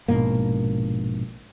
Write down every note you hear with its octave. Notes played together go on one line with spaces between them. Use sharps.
A#1 G#2 B2 A#3